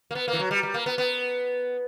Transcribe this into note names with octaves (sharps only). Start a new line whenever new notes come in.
A#3
B3
A#3
E3
F#3
G3
G3
A#3
B3
B3